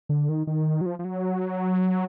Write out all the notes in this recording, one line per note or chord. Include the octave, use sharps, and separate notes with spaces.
D3
D#3
D#3
F#3
F3
F3
F#3